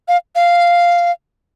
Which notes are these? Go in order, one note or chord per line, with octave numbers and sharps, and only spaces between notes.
F5
F5